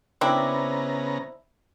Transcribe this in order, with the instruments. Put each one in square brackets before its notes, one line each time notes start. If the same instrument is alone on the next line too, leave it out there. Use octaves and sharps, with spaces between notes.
[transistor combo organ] C#3 B3 A#5 [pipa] C4 D4 E4